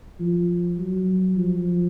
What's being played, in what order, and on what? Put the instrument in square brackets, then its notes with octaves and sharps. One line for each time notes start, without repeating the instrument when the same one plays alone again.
[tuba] F3
F#3
F3